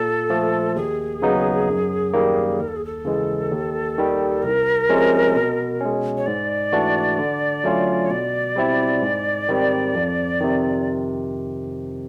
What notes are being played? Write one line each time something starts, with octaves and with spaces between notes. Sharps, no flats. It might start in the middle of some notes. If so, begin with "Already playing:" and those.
Already playing: A#2 A4
F3 A3
D#2 G#4
C#3 F#3 B3 D#4
F#2
D#3 G3 A#3
D#2 A#4
A4
G#4
A4
C#3 E3 G#3
D#2
D#3 G3
C2 A#4
C3 F3 G#3 C#4
B2
G#3 C#4
C#5
G#2 D5
E3 A3 D4 F#4
D3
F#3 A3 C#4 F4
C#5
B2 D5
G3 C4 E4
G#2
D#3 G3 C4
F2
C3 D#3